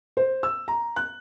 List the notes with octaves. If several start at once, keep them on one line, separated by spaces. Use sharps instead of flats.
C5
E6
A#5
F#6